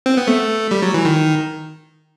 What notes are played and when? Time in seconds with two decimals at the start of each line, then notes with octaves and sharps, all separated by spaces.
0.06 C4
0.17 B3
0.28 A3
0.71 G3
0.82 F#3
0.94 E3
1.05 D#3